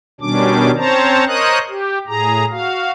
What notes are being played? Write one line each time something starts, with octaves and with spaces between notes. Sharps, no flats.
B2 D#3 G3 C#4 D4 D6
C4 C#4 C5 C#5 A5 A#5
A#4 C5 C#5 D#5 D#6 F#6
G4
A2 G#4 A#5
F#4 F5